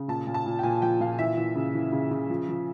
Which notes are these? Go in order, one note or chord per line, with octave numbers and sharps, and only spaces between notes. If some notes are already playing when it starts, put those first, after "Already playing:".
Already playing: C#3
A#2 A5
A#2
A5
A#2
G5
A#2 G#5
F3 G5
A#2 F5
E3 E5
E3
C#3
E3
C#3
C#3
F3
F3